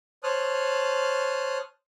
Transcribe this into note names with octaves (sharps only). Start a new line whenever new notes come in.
C5 C#5 A5 D#6 F6 F#6